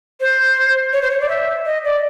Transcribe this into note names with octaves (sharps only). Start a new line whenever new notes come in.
C5
C#5
C5
C#5
D5
E5
D#5
D5